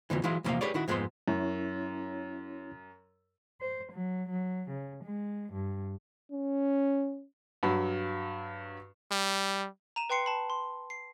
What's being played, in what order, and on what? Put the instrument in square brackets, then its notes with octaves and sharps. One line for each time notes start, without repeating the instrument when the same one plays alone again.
[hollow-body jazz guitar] F2 B2 D3 E3
E3 F#3 G#3 E4 F4 F5
E2 A2 C3 F3 A#3 F5
G4 G#4 B4 C#5 D5
D#3 E4 F#4
F2 G#2 G#3 B3 C5 C6
[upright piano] F#2 [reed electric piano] C#4 E4 C#5
[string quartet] C5
F#3
F#3
C#3
G#3
G2
[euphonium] C#4
[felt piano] G2 F#3
[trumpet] G3
[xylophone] A#5 D#7 E7
B4 G5 C6 C7 C#7
A5 B5
C6
C7